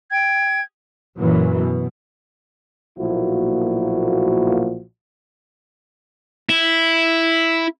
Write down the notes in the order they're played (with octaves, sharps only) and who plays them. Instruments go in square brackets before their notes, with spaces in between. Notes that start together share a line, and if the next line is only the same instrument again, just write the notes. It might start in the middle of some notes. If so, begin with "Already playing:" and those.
[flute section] G5 G#6
[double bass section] F#2 A#2 E3 F#3
B2
[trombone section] B1 A#2 F3 A#3 E4 F#4
[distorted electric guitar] E4